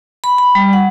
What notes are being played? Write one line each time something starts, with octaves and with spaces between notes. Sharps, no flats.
B5
B5
G3
F#5